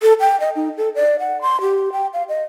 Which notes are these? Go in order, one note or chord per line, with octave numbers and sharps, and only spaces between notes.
A4
G5
D#5
D#4
A4
D5
F#5
C6
G4
G5
F5
D#5